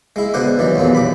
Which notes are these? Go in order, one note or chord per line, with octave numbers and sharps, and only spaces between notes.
G#3 E4
B2 D3 C5 F#5 D6
D#2 E3 F#3
B1 E2 A#2 E3
D#2 B5 D6